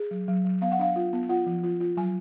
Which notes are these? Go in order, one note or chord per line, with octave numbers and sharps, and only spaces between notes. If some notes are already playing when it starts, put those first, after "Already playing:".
Already playing: G#4
F#3
F#3
F#3
B3 F5
F#5
D4 F5
F4
B3
F4 F#5
F3
F4
F4
F#3 G#5